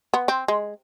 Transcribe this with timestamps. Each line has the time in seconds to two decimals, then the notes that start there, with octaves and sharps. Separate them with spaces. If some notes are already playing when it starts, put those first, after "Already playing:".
0.14 B3
0.28 C4
0.48 G#3